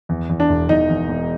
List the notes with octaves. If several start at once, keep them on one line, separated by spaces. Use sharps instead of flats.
E2
E2
D4
E1
E2 D#4
E2
E1